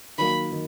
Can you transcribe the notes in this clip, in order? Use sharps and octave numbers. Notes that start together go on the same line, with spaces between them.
D#3 F#3 A#3 B5
D#3